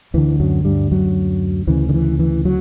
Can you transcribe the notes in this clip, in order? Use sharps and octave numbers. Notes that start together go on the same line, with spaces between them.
D2 D3 E3
F#2 F#3
G2 G3
F#2 F#3
D2 C#3 E3
D3
E3
E3
F#3